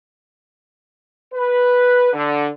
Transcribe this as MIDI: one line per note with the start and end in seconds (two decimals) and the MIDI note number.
1.34 2.12 71
2.13 2.47 50